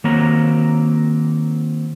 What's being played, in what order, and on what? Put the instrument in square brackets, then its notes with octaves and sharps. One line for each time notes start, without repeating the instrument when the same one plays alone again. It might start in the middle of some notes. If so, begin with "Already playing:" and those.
[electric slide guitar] D#3 A#3 C4 F#4 C#5 A#5